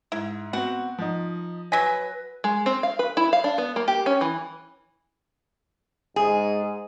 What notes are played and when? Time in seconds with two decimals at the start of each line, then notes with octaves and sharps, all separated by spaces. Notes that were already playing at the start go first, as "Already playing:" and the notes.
0.12 G#2 E4
0.53 B3 C4 F#4 F#5
0.98 F3 D#4
1.72 F#3 B4 G#5 A#6 B6
2.44 G#3
2.66 C4
2.83 F5
2.99 B4
3.17 E4
3.33 F5
3.44 D4
3.58 B3
3.76 A#3
3.88 G4
4.06 C#4
4.21 E3
6.16 G#2 G#3 G#4